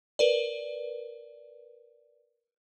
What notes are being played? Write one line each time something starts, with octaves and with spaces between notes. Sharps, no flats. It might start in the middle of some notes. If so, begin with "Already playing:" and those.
A#4 B4 D5